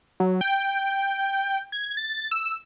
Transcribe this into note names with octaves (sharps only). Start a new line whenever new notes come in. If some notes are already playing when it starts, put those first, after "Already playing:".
F#3
G5
G#6
A6
E6